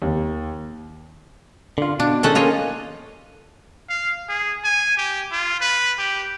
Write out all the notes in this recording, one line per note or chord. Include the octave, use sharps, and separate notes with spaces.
D#2
D3 F4
B2 D4
D#3 G#3 C#4 D#4 A4 F#5
A#3 C#4 F4 G#4 C#5 D#5
F5
G#4
G#5
G4
F4
B4
G4